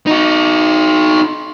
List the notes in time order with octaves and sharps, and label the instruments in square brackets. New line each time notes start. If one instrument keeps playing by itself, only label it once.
[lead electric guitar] D#4 F#4